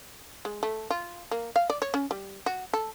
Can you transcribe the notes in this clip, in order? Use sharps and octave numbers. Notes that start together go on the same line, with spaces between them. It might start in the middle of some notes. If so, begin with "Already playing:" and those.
G#3
A3
F4
A#3
F5
D5
C#5
C#4
G3
F#4
A4